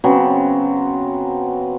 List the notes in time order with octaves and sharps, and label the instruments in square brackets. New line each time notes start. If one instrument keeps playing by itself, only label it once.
[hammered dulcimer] C#3 F#3 B3 C4